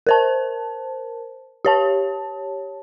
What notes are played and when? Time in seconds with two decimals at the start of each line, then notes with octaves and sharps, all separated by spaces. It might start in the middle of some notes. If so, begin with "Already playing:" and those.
0.07 A#4 C5 A5
1.65 G4 C#5 A5